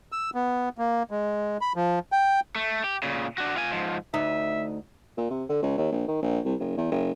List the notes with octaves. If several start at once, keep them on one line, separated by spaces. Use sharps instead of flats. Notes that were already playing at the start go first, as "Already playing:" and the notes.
E6
B3
A#3
G#3
B5
F3
G5
A3
G4
A#2 C#3
D4 F#4
F4 G#5
G#2 F3
D2 D#4 E5
A#2
C3
D3
C#2
D#2
A#1
D#3
A#1
C2
F#1
E2
F#1